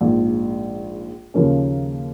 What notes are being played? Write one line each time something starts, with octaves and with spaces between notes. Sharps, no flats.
A#1 G#2 F3
D#2 C#3 F3 A#3 C#4